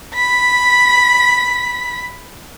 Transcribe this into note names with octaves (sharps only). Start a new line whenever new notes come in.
B5 B6